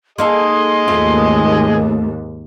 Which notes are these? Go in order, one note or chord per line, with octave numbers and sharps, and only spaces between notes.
A#3 D#4 G#4 A4 D#5 C6
D#2 G#2 A3 C4 F4